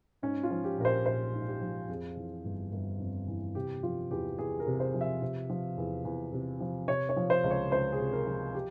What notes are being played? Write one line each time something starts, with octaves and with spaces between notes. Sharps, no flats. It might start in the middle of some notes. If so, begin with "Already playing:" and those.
G#2 C#4
F4
F3
G4
A#1 A#4
C5
A#1 C5
G#2
G4
F3
F2 G#4
E3
G1
G1
F2
E3
C3 G4
F3 F4
E2 G4
E2 G#4
A#4
C3
C5
F3
E5
C3
F3
E2
E2
C3
F3
C3 C#5
C#5
F3
C5
C#2
C#5
C#2 C5
G#4
C3
A#4
F3
G4